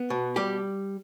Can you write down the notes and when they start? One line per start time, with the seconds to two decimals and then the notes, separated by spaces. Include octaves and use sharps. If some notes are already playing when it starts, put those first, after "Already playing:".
Already playing: B3
0.10 B2
0.36 G3 G4